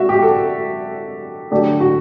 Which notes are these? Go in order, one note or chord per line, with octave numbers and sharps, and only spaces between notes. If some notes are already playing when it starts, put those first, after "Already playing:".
Already playing: F#4 E5
G4
A4
D3 F#3 A3 D4 G4
F#4